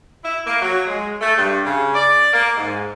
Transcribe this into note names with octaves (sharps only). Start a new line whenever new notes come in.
E4
A#3
F#3
G#3
A3
G2
C#3
D5
A#3
G#2